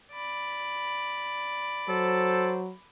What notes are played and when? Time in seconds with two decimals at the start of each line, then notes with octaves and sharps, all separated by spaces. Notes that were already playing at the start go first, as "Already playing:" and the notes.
0.13 D5 B5
1.89 F#3 A4 C5